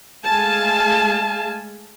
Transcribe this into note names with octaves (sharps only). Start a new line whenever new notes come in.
G#3 A3 F5 G#5 A5